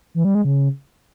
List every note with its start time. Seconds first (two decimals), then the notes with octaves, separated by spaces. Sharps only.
0.14 E3
0.25 G3
0.35 G#3
0.45 C#3